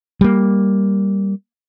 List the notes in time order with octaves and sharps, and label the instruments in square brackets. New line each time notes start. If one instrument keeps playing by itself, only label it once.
[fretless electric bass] G3 A#3